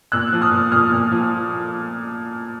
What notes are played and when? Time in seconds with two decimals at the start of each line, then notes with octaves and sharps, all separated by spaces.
0.12 A#2 E6 F#6
0.33 F3
0.42 D#6 F6
0.51 A#2
0.72 A#2 D#6 F6
0.92 A#2
1.12 F3